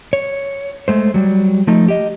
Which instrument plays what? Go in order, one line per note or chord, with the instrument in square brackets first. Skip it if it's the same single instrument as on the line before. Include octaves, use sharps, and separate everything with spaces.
[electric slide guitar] C#5
G#3 A3 C5
F#3 G3
F3 A3 D#4
G4 D#5